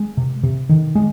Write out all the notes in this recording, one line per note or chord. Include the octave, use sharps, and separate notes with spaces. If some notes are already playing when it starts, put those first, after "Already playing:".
Already playing: G#3
C3
C3
D#3
G#3